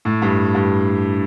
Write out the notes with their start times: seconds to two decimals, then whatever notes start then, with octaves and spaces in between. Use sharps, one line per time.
0.05 A2
0.22 G2
0.55 G2